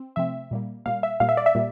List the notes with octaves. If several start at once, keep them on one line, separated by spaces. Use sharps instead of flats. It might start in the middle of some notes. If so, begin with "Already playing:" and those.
Already playing: C4
C3 F3 A3 C4 E5
A#2 G3 A#3
A#2 G3 A#3 F5
E5
A#2 G3 A#3 F5
E5
D5
E5
A#2 G3 A#3